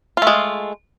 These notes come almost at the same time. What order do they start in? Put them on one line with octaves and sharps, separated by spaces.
F4 A3 G#3